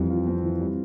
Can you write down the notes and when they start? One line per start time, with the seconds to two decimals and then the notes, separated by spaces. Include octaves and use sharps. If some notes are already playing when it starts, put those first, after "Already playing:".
Already playing: F2 E3 G3 C4
0.10 F4
0.27 C4
0.43 E3
0.61 G3